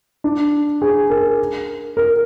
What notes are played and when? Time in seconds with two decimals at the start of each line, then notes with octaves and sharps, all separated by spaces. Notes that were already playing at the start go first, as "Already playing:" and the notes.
0.24 D4
0.82 G#4
1.10 A#4
1.97 A#4